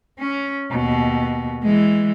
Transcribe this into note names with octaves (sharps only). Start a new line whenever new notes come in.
C#4
D#2 B2
E3 G#3